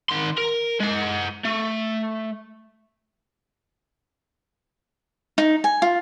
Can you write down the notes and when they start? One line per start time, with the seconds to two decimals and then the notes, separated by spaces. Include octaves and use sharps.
0.10 D#3 C6
0.38 A#4
0.80 G#3 F#5
1.45 A3
5.38 D#4
5.64 G#5
5.82 F4